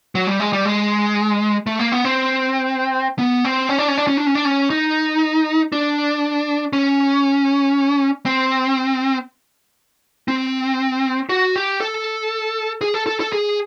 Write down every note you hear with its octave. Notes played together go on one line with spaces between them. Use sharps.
F#3
G3
G#3
G3
G#3
A3
A#3
B3
C4
B3
C4
C#4
D4
C#4
D4
C#4
D4
C#4
D4
C#4
D#4
D4
C#4
C4
C4
F#4
G4
A4
G#4
A4
A4
A4
G#4